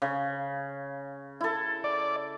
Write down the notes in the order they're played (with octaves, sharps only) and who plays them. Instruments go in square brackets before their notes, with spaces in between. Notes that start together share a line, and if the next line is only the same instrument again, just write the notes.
[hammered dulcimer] C#3
E4 A4
[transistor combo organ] D5